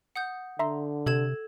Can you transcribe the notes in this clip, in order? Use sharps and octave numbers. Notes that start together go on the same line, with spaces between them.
F#5 D#6 G6
D3 E5 A#5 C6
C3 A4 G#6 E7